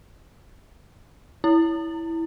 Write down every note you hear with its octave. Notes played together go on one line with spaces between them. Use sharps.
E4